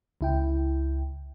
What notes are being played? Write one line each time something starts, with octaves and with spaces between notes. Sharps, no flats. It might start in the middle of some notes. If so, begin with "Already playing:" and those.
C#2 E4 G5